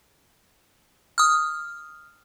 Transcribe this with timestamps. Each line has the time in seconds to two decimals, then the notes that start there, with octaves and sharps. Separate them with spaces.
1.18 D#6 F6